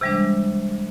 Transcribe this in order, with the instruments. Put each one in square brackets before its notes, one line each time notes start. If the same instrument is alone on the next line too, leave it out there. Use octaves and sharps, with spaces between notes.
[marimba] C3 E3 G3 G#3 D4